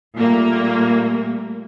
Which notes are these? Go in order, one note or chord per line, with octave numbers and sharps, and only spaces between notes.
A#2 G3 A3 A#3